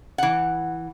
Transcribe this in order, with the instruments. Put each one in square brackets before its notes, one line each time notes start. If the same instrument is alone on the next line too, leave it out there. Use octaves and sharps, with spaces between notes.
[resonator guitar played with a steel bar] E3 F#5